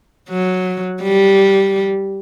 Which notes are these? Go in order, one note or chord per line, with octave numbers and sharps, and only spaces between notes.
F#3
G3